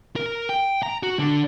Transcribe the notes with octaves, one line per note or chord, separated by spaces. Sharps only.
A#4
G5
A#5
F#4
D3